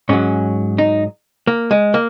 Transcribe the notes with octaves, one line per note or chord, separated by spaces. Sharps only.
G#2 F#3 C#4
D#4
A#3
G#3
A#3